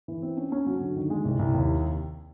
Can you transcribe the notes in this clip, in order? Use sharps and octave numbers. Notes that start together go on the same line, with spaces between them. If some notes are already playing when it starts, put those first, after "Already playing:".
E3
C4
C#4
C#4
F#3
D3
D#3
G#3
C2
C2
D#2